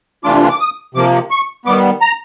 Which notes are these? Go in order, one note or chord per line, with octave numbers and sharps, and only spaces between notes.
C3 E3 A3 D4 F4 D6
D6
D#6
C3 F3 A#3 D6
C#6
D#3 G3 B3 D6
A#5